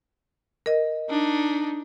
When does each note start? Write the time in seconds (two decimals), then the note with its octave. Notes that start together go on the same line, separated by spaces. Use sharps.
0.66 A#4 D#5
1.10 D4 D#4